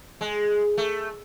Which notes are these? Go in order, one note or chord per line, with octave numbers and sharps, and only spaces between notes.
G#3
A3